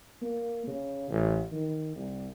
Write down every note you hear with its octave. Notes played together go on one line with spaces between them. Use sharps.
A#3
C#3
A1
D#3
C2